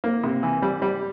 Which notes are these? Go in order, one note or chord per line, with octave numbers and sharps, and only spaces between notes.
A#3
C3
E3
G3
G3